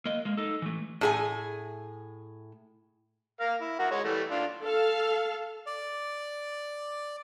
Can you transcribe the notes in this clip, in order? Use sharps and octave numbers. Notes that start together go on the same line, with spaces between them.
A#3 D#5
G#3 A#3
D#4 A4
E3 A3
A2 G#4 G#5
A#4 F5
E4
F#4 A#4
G#3 C#5
E3 G3 A3
D4 F4
A4 F5
D5